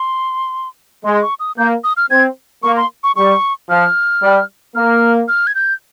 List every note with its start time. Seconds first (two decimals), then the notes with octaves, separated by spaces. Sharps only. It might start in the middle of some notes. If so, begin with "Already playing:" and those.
Already playing: C6
1.04 G#3 C6
1.22 C#6
1.40 D#6
1.58 A#3 G6
1.84 D#6
1.97 F6
2.10 C4 G#6
2.63 A#3 C#6
2.77 C6
3.04 C#6
3.16 G3 C#6
3.69 F3 F6
4.22 G3
4.75 A#3 F6
5.28 F6
5.47 G#6
5.55 G6